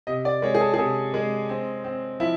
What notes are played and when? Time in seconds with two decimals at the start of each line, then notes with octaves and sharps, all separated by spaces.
0.07 C3 D#5
0.25 D5
0.42 G#3 C#5
0.55 G#4
0.61 A4
0.74 G#4
0.78 C3 A4
1.14 G#3
1.49 C4
1.84 C4
2.20 F3 E4